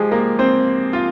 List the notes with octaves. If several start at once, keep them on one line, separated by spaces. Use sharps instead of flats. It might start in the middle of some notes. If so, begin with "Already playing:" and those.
Already playing: F3 G#3 G4 G#4
A#3 A#4
C4 C5
F4 F5